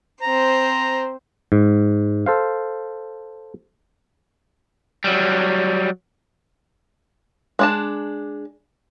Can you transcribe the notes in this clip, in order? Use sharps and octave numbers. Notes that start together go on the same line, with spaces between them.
C4 C5 A#5
G#2
A4 C5 F5
F#3 G3
G#3 D4 A5